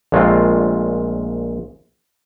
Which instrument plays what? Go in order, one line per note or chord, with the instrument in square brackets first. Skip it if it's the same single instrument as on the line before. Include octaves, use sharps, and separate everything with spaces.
[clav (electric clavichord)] A#1 A#2 G#3 A3 C4 F4